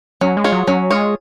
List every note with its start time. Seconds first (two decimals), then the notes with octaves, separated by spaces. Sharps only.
0.21 F#3 C#4
0.37 G#3
0.44 F4 G#4 C#5
0.52 F#3
0.67 F#3 C#4
0.91 G#3 F4 G#4 C#5